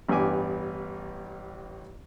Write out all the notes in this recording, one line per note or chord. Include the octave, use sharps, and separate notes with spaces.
A1 G2 B3 G4 G#5 D6